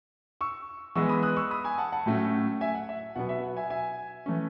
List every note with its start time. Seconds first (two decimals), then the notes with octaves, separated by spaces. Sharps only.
0.41 C#6 E6
0.95 E3 G#3 B3 C#6 E6
1.09 B5 D#6
1.23 D#6 F#6
1.36 C#6 E6
1.51 B5 D#6
1.64 G#5 B5
1.78 F#5 A5
1.92 F#5 A5
2.06 A2 F#3 A3 C#4
2.61 E5 G#5
2.74 F#5
2.89 E5
3.15 B2 F#3 B3 F#5
3.29 E5
3.44 F#5
3.57 E5 G#5
3.70 E5 G#5
4.26 E3 A3 C#4